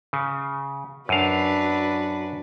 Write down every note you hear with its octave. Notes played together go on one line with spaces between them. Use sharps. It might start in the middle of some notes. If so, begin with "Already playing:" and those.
C#3
F#2 D4 F#4 B4 F5